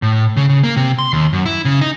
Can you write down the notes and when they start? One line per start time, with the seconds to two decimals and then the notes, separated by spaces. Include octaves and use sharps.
0.02 A2
0.37 C#3
0.49 C#3
0.64 A#3
0.77 C3
0.99 C6
1.13 D#2
1.33 F#2
1.46 E4
1.65 C#3
1.81 D#4